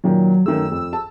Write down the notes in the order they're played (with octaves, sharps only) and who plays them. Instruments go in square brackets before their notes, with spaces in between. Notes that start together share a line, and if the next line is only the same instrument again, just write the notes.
[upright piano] A#2 D#3 [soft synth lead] F#3
[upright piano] F#2 D#3 A3 [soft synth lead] E6
[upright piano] F2
A5